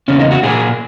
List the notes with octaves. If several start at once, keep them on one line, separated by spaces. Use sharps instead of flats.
E2 C#3 A#3 C#4
D#4
F#4
A#2 A#3 G#4